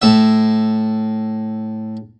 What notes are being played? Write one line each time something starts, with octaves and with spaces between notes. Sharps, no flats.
A2 E5